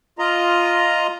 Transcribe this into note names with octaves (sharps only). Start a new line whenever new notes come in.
F4 D#5 A#5